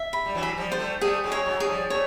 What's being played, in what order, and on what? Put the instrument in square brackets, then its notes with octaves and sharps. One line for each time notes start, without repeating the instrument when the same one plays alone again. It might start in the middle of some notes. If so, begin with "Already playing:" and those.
Already playing: [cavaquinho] E5
B5
[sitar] G3
E3 F#3
[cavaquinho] B5
[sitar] F3 G3
[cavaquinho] C5
[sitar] G3 A3
[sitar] G3 A3 [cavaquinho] G#4
[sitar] F#3 G#3
[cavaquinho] C#5
[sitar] F#3 G#3
[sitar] G#3 [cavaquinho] G#4
[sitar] F3 G3
[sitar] G3 A3 [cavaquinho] C#5